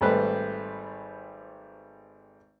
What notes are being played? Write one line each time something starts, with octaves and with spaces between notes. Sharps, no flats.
G#1 G3 A3 B4 C5